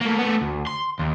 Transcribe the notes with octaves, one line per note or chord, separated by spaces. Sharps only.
A3 A#3
A3 B3
D2
C6
D#2